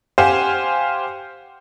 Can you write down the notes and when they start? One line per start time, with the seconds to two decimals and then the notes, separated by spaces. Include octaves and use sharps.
0.18 G4 C5 F5 F#5 G#5